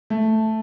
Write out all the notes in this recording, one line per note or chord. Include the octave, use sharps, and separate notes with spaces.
A3